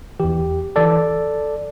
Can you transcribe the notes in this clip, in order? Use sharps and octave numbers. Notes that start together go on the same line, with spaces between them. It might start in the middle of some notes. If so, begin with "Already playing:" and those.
E2 E3 G4
E3 A4 D5